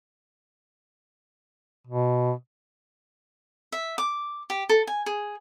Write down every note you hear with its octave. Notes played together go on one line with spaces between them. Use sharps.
B2
E5
D6
G4
A4
G#5
G#4